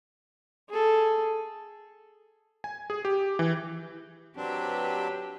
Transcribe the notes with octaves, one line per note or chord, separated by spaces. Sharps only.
G#4 A4
G#5
G#4
G4
E3
F#3 C4 D4 G4 B4